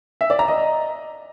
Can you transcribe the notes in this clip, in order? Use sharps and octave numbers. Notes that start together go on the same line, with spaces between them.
E5
D5
A#5
D#5